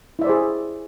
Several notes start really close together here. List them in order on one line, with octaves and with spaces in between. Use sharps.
E4 E5 D5 C5 G#4